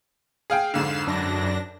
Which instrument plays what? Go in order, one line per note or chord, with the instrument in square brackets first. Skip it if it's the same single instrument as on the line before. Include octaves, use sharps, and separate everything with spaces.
[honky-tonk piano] G#4 F5 G5
[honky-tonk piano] F2 G#2 D3 [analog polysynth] F5 C7 E7
[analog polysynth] F#2 D4 A#6